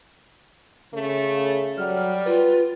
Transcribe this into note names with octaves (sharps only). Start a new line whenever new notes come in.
C#3 A3
F#3 G3 F6
F4 B4